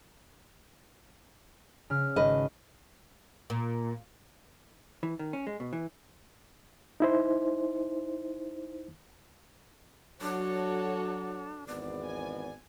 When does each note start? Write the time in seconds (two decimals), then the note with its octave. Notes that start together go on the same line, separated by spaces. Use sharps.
1.90 C#3 F6
2.16 G#1 B4 D#5
3.50 A#2
5.03 E3
5.19 D#3
5.33 C#4
5.47 G#3
5.60 B2
5.73 E3
7.00 D#4 E4 C5
10.21 F#3 D4 F#4 A4 C#5
11.67 G#1 E2 B3 D5
12.04 G#5